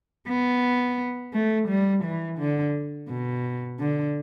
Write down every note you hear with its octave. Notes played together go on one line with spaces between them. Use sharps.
B3
A3
G3
E3
D3
B2
D3